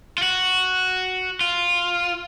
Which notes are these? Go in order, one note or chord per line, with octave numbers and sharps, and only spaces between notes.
F4
F#4
F4